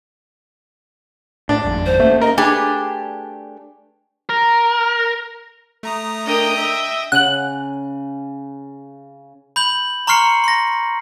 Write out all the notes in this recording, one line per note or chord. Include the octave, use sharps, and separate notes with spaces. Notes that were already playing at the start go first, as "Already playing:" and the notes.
A2 D4
G#1 F2 G#2
C5
A3 A#3 C#4
A#4 D#5
A3 D4 G4 G#4 B4
A#4
A3 A#5 D#6
D4 A#4 D#5 G5
E5
C#3 F#5 F#6
B5 G6 F#7
A#5 C6 C#6 F6 C7 C#7
C6 A#6